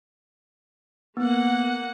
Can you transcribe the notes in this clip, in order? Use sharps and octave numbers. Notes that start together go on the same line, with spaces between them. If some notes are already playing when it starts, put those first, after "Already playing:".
A#3 B3 F#5